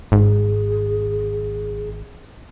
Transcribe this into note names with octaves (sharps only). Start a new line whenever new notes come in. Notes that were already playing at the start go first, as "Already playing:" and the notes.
G#1 G#4